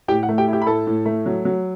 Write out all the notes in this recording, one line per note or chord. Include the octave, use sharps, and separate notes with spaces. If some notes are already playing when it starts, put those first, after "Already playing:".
A2 G4 G5
F#5
A3
G4 G5
E4 G4 G5
B5
A2 A4 A5
A2
A3
F#3
F#3